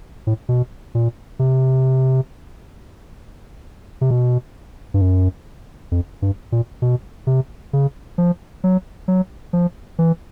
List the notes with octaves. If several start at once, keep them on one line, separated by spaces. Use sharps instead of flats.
A2
B2
A#2
C3
C3
B2
G2
F#2
F2
G2
A#2
B2
C3
C#3
F3
F#3
F#3
F3
E3